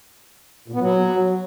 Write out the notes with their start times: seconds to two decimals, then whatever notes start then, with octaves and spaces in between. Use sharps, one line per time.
0.68 A#2
0.74 B3
0.80 F#3